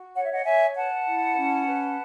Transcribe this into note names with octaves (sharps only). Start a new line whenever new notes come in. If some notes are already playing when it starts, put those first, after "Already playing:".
Already playing: F#4
C#5 F#5
E5
D#5 F#5
C#5 E5 G#5
B4 F#5 A5
E4
C#4
B4